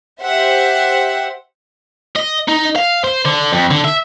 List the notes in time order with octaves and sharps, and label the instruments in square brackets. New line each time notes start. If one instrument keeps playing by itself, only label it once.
[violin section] G4 C5 E5 F#5
[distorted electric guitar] D#5
D#4
F5
C5
D3
F2
D3
E5